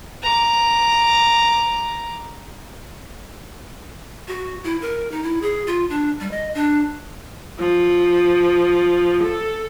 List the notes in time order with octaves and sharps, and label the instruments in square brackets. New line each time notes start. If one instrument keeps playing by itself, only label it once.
[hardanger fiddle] A#5 D6
[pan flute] F#4
E4
A#4
D#4
E4
G#4
F4
D4
G3
D#5
D4
[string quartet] F3
A4